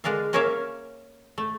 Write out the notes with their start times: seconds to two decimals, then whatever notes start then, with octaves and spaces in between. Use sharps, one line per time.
0.04 D3 G#3 D4 A#4 F5
0.33 A#3 C#4 A#4 C#5 E5 F5
1.38 A3